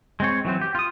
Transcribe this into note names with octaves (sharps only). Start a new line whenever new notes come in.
G#3 C4 C#5
E3 F#3 C4
G4
F4 D#6